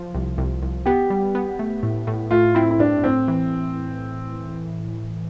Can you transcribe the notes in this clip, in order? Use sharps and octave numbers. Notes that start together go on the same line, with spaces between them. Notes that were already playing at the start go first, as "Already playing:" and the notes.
Already playing: F3
C2
C2
C2
B3 G4
G3
B3
A3
A2
A2
A3 F4
C4 E4
E4
G2 D4
A2 C4
E3